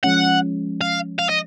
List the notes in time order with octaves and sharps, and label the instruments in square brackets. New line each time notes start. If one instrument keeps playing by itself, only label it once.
[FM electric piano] F3 G#3 C#4 [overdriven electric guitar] F#5
[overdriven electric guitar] F5
F5
D#5